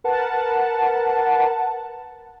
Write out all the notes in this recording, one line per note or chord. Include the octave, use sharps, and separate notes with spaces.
A#4 B4 F#5 A5